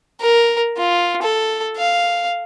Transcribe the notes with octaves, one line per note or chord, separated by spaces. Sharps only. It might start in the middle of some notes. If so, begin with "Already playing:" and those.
A#4
F4
A4
F5